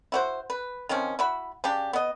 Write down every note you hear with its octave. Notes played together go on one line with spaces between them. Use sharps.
E4 F#4 C5
B4
D#3 F3 C4 C#4
E4 F#4 B5
C#3 D4 G4
B3 D#5